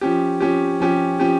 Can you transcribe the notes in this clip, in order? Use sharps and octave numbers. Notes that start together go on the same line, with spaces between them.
F3 C#4 G4
F3 C#4 G4
F3 C#4 G4
F3 C#4 G4